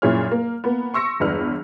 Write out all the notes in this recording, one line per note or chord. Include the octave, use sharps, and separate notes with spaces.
F#2 A#2 E4 G#4 C#5 F6
A#3
A#3 B3
C6 C#6 E6 A#6 C#7
G1 E2 G#3 D4 B4 F6